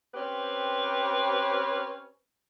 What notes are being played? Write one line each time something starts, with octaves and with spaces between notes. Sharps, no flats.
C4 C#4 G4 B4 C5